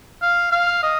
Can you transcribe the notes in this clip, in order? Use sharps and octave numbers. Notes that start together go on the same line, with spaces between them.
F5
F5
D#5